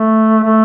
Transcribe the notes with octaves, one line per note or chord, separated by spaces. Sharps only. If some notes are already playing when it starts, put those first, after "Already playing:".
Already playing: A3
A3